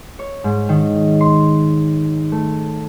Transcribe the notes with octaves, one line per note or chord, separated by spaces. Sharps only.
C#5
G#2
D#3
C6
A3